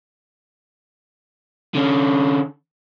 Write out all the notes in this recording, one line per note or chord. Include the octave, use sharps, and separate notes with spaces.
D3 C#4